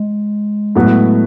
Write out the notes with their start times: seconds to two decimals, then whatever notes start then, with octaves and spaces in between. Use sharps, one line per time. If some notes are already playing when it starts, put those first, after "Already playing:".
Already playing: G#3
0.76 A2 F#3 B3 F#4